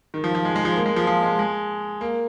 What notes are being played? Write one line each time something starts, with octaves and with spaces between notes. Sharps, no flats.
D#3
F3
F3
G#3
G#3
F3
A#3
G#3
F3
F3
G#3
G#3
A#3